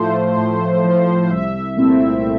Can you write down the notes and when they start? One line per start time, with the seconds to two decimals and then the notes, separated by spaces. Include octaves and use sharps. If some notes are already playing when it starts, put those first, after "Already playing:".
Already playing: A2 F3 A3 C5
0.37 A2
0.84 F3 A3
1.31 C2 E5
1.77 A#2 A3 C4 E4